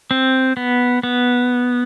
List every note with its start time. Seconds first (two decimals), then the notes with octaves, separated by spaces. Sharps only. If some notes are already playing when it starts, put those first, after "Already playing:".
0.11 C4
0.57 B3
1.03 B3